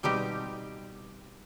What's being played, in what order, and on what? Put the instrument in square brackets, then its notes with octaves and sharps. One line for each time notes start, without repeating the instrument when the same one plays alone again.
[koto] B2 G3 C4 D#4 G4